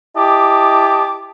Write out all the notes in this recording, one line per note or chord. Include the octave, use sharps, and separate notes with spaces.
E4 G4 D#5 A5 D6